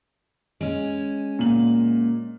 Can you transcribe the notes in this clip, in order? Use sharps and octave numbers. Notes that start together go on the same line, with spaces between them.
G#3 C#4
A#2 F#7